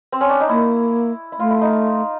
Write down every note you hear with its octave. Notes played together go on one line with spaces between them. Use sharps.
C4
C#4
D4
D#4
A#3 E4
E4
A3 F4
E4
D#4